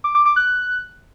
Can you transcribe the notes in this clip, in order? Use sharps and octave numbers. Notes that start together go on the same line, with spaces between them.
D6
D6
D6
F#6